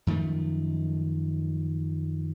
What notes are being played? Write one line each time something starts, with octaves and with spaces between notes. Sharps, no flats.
F#2 D#3 F3 A3